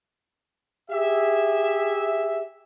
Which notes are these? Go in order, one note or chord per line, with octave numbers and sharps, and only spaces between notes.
G4 G#4 E5